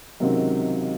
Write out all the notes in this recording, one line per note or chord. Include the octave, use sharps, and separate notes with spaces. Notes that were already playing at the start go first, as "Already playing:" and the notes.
C#2 C3 D#3 F#3